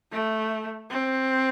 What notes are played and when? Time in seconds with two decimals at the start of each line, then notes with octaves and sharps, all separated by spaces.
0.12 A3
0.90 C4